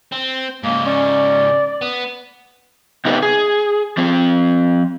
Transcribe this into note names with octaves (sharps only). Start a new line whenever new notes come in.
C4
G#2 C#3 A#3
C#4 D5
B3
C3 B3 D#4 G4 B4
G#4
F3 C4